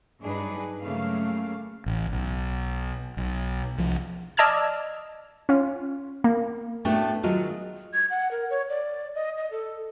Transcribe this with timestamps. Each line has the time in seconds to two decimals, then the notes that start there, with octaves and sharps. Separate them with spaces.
0.20 G2 F#3 D4 D#4 G#4 B4
0.80 C#3 F#3 A3 A#3 F5
1.86 A1
2.12 B1
3.17 B1
3.78 C2 F3
4.37 D5 D#5 A5 E6 F6 G#6
5.49 C#4 F4
6.24 A#3
6.85 A2 A3 B3 D4 F#4 G5
7.23 D#3 F#3 G#3 F4 F#4
7.93 G#6
8.10 F#5
8.31 A#4
8.50 C#5
8.70 D5
9.15 D#5
9.37 D#5
9.51 A4